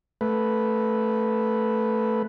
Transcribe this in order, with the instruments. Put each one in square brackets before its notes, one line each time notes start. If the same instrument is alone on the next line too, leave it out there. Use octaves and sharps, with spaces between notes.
[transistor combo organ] A3 B4